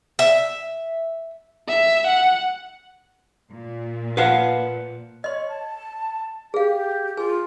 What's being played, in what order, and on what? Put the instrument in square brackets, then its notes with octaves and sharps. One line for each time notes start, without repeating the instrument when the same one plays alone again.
[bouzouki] E5
[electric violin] E5
F#5
[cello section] A#2
[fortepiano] F3 F#5 [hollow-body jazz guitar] B4 F5
[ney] C#5 [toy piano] D#5 C6
[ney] A5
[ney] G4 [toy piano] G#4 F5
[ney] F4 [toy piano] G#4 G#5